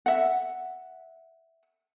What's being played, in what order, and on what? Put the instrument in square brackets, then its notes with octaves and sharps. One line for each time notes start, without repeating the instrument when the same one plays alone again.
[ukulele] E5 F#5